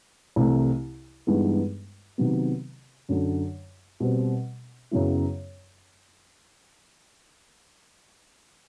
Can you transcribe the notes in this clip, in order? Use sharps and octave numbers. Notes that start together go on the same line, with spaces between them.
C2 C3 E3 A3
G2 E3 G#3 B3 D#4
C3 D#3 F#3 B3
F#2 D3 F#3
B2 G3 C4
F#2 C#3 F#3 B3 E4